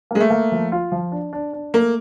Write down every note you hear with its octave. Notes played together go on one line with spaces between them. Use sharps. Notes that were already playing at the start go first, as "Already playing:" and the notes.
G#3 A#3
A3
A#3
F3
F4
F3
D4
D4
D4
A3 A#3